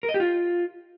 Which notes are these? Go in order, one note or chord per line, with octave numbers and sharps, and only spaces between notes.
A#4
D#5
G4
F4